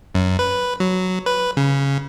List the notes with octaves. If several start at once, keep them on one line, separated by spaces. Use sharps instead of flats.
F#2
B4
F#3
B4
C#3